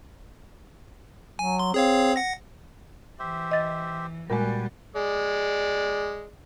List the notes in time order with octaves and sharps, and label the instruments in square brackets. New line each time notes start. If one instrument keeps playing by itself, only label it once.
[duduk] F#3 [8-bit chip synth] G#5
[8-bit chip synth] C6
[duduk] C4 [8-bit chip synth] G#4 C#5 F5
[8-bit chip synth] F#5 A#6
[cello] E3 [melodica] G4 C5 E5
[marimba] D#5 A6
[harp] A#6
[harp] A#2 F#4 [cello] G3 [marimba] G#3 A#4 [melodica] B4 G5 G#5
[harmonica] G#3 D5